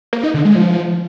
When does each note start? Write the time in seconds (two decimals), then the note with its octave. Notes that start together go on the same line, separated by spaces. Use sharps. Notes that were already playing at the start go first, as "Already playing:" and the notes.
0.13 A#3
0.23 D#4
0.34 D3
0.45 G#3
0.56 F3